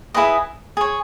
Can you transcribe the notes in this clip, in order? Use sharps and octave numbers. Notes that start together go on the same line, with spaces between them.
E4 G#4 B4 D#5
G#4 C#5